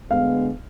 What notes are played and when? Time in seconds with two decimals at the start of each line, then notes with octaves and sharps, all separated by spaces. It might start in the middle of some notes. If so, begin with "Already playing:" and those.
0.10 D2 D3 G#3 B3 F5